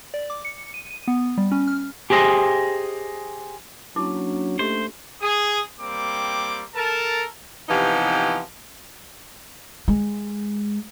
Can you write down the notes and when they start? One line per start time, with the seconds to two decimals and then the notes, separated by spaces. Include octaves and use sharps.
0.14 D5
0.30 D6
0.45 C#7
0.74 D#7
0.91 D#7
1.08 B3
1.38 G3
1.51 C#4
1.67 F6
2.10 G4 G#4 C5 D#5
3.96 F#3 A#3 C#4 D4 E4 A5 D6
4.59 A3 G4 C5 D#5
5.21 G#4 D#6
5.79 G3 A#3 C4 D6
6.75 A4 A#4 A5
7.69 C3 E3 F3 B3 D#4 G4
9.88 G#3